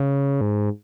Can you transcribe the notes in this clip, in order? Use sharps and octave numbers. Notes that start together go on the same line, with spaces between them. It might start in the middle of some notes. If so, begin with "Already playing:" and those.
Already playing: C#3
G#2